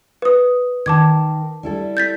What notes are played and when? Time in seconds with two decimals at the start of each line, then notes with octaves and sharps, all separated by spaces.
0.22 B4 D#6
0.86 D#3 A#4 A5 D6 G#6
1.63 G3 E4 A4
1.97 G6 A6 B6